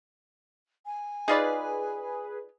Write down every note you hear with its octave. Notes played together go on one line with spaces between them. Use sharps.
G#5
D#4 F4 G#4 B4 D5